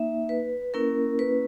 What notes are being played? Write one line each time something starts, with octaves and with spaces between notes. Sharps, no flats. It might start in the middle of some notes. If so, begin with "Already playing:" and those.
Already playing: A#3 D#4 E5
B4
A#3 C#4 E4 A#4
B4